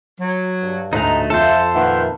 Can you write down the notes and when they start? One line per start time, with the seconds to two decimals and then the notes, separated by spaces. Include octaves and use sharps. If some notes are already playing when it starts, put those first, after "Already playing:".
0.20 F#3
0.62 G2
0.93 D2 G#2 A3 D#4 A#5
1.30 F2 F4 A4 C5 E5 A5
1.74 A#2 D#3 A#3 B4 E5 F#5